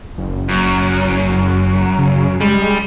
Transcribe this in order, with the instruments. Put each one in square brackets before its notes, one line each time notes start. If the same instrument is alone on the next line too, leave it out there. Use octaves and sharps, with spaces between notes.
[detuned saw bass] F#1
[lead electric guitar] F#2
[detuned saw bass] C#3
[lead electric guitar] G3 [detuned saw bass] G#3